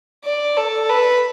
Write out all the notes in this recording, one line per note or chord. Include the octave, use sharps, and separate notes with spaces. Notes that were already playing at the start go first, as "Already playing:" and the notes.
D5
A4
B4